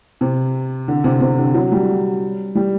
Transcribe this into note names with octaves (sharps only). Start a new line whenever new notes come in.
C3
D3
C3
C3
D3
F#3
G3
G3